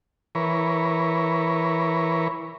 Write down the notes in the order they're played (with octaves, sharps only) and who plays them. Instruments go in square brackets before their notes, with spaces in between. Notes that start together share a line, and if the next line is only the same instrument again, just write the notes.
[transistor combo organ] E3 A#4 B4 C#5